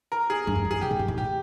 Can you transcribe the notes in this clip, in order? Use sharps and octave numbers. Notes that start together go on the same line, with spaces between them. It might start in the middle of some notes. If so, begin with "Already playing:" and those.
A#4
G#4
G2
F2
G2
G#4
C3 G4
A#2
G2
G#2
A#2 G4